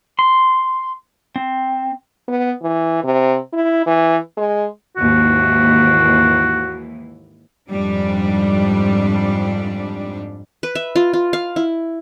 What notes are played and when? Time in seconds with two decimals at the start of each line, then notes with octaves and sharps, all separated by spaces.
0.19 C6
1.36 C4
2.28 B3
2.62 E3
3.04 C3
3.53 E4
3.86 E3
4.37 G#3
4.97 D#2 G#2 E3 F#4
7.68 F2 G#2 G3 D4
10.63 B4
10.75 E5
10.96 F4
11.13 F4
11.33 F5
11.56 E4